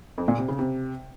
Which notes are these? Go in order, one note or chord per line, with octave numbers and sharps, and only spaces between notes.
F2
A#2
C3
C#3
C3